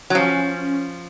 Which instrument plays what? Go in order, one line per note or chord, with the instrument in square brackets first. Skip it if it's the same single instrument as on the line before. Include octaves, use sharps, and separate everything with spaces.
[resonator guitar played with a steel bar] F#3
[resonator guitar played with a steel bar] F3 [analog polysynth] C#4